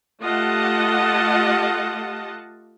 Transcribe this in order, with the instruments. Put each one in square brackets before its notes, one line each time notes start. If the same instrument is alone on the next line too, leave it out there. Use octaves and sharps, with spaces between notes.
[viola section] A3 F4 G4 D#5 F#5 A5